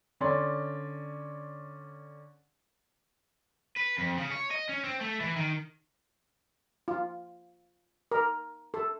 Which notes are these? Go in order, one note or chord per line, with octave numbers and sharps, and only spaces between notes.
D3 C#4 D5 C6
B4
F2
C#3
C#5
D#5
C#4
C4
A3
E3
D#3
F4
A#4
A4